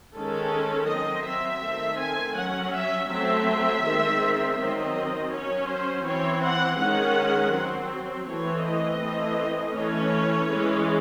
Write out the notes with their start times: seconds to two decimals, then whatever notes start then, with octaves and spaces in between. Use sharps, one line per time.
0.15 D#3 G#3 C#4 A4
0.88 F#3 C4 D#5
1.25 E5
1.62 D#3 A3 C4
1.99 G#5
2.36 F#3 C#4 F#5
2.73 E5
3.09 F#3 A3 C4 E5
3.83 D#3 G#3 C4
4.58 D#3 F#3 C4 D#5
5.32 F#3 C#4 C#5
5.68 C5
6.06 E3 C4 C#5
6.43 F#5
6.79 D#3 G#3 C#4 F#5
7.53 F#3 C4
8.27 E3 A3 C4 C#5
8.65 D#5
9.01 E3 A3 C4
9.74 E3 A3 C#4 C#5
10.50 E3 G#3 C#4